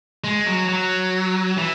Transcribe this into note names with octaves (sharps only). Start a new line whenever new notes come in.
G#3
F#3
F#3
E3